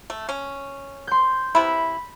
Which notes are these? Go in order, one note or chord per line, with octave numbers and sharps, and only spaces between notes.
A3
C#4
C6 G6
C3 E4 B5